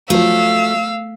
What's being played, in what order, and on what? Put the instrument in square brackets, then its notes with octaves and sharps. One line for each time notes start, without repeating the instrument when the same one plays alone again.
[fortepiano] F3 F#3 [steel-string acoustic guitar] A3 [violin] F5 E6